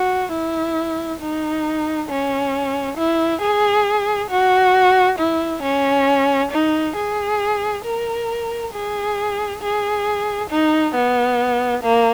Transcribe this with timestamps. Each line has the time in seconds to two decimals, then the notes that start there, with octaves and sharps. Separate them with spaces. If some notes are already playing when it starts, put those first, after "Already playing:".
Already playing: F#4
0.32 E4
1.20 D#4
2.09 C#4
2.97 E4
3.41 G#4
4.30 F#4
5.18 E4
5.63 C#4
6.51 D#4
6.96 G#4
7.84 A#4
8.73 G#4
9.62 G#4
10.50 D#4
10.94 B3
11.83 A#3